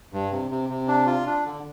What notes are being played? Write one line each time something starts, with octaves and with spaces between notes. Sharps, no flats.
G2
C3
C3
C3
D4
F4
D4
D3